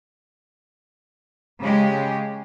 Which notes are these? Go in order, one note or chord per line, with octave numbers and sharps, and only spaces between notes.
C#3 G#3 G4